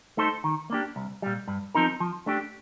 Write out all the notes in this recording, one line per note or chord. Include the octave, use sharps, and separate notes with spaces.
A3 D#4 A4 C5
D#3
A#3 D4 G4
C2
A#2 G3
G2
F3 C4 D#4 A#4
F3
A3 D4 G4